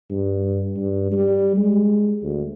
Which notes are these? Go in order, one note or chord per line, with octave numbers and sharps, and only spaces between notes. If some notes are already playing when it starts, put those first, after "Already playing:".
G2
G2
G3
G#3
D2